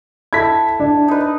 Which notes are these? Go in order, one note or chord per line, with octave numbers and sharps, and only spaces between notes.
E4 A4 G#6 B6
D4
D#4 B4